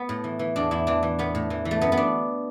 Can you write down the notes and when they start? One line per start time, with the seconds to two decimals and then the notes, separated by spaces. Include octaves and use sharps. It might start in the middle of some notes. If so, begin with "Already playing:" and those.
Already playing: B3
0.09 A2
0.24 E3
0.39 E3
0.56 E2 D4
0.71 E2 E4
0.87 E3 D4
1.03 E3
1.19 A2 B3
1.35 A2
1.50 E3
1.65 E3
1.71 A3
1.81 F#2 B3
1.92 B3
1.97 D4